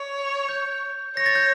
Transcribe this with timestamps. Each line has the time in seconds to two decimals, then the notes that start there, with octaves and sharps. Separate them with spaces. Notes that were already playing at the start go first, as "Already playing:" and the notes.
Already playing: C#5
0.49 G6
1.17 C#5 A#6
1.26 A6
1.35 G6